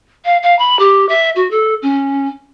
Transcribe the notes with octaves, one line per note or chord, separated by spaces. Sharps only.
F5
F5
B5
G4
E5
F#4
A4
C#4